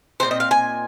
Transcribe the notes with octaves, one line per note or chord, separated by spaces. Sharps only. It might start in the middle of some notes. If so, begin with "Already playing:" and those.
A#2 G#3 C4 D#4 C5
D#5
F5
G#5